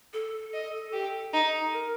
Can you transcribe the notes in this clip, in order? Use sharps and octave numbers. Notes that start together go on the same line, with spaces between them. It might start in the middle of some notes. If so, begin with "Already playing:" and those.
A4
D#5
G4
D#4
A#4